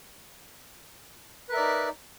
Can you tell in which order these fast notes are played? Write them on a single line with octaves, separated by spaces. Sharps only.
B4 A#4 E5 D5 D#4